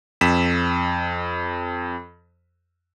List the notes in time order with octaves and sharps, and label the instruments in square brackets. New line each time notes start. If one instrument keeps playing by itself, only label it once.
[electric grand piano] F2 B6 E7